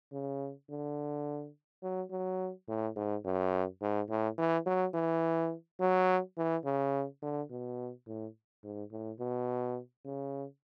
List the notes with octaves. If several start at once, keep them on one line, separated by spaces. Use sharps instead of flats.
C#3
D3
F#3
F#3
A2
G#2
F#2
G#2
A2
E3
F#3
E3
F#3
E3
C#3
D3
B2
A2
G#2
A2
B2
C#3